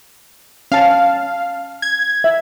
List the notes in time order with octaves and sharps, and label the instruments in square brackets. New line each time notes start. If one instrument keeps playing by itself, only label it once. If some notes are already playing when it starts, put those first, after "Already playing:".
[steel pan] C#4 A5 [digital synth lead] F5
[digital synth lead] G#6
[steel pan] E5